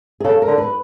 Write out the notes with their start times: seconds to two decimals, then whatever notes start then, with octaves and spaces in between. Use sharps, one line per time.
0.20 G#4
0.24 C#3 A4
0.42 A#4
0.47 D3
0.58 B4